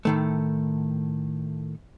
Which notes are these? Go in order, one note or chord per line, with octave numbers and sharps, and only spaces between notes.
A2 D#3 A3